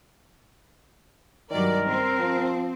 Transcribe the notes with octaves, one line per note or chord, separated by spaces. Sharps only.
G2 D#3 F#3 A#4 D5
C4
F3